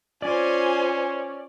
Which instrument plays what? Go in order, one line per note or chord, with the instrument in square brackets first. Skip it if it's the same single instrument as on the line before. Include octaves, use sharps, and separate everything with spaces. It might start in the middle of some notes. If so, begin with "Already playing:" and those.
[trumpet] C#4 [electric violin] F4 C5 [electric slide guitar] D5 [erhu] G#5